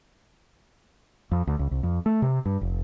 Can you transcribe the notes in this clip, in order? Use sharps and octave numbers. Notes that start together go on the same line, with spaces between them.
F2
D2
C#2
C2
F2
A3
C3
G2
F1